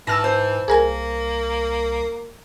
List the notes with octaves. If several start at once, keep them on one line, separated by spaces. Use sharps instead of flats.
G#2 E3 A5 E6 F6 A#6
C5
C2 A#3 G#4 A#4 G#5